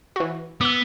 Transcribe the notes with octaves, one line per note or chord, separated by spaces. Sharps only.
E3 F#4
B3 D6 E6